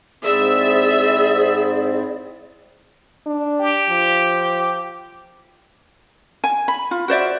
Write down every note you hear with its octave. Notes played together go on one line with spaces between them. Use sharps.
G#2 C4 E4 G#4 D5 E5
D4
G4
F3
G#5
B5
F4
F#4 C5 D5 E5